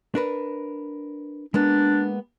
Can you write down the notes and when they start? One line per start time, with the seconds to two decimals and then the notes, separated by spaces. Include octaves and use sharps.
0.15 D4 A#4 B4
1.54 G#3 A#3 B3 D4